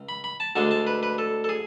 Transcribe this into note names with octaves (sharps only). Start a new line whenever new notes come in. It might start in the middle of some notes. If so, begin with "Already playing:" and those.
Already playing: C#2
B5
B5
A5
D2 D3 G#3 D4 A5
A5
B4
B4
A4
A4
G#4